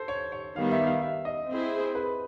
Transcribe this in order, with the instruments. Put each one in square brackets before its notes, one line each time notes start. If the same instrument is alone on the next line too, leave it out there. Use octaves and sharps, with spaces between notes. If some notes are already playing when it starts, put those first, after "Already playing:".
Already playing: [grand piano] A4 C5
C#5
C#5
[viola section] D#3 G3 B3 [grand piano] F5
[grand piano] E5
F5
E5
D#5
[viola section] C4 E4 G#4 C5
[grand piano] B4